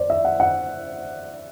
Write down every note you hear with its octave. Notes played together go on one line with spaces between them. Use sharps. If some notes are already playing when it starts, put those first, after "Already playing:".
Already playing: C5 D5
E5
F#5
F#5